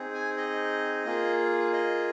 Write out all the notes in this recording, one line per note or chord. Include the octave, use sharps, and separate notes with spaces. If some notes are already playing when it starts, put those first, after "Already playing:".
Already playing: C4 D#4 G#4
G#5
D#5
A#3 F4 G#4
D#5